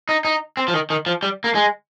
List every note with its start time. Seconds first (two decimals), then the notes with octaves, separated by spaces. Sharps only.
0.09 D#4
0.25 D#4
0.57 C4
0.68 F3
0.74 D#3
0.90 D#3
1.06 F3
1.23 G3
1.44 A#3
1.55 G#3